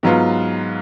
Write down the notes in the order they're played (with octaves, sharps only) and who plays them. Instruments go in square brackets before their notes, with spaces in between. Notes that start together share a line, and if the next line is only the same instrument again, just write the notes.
[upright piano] G#2 F#3 B3 F4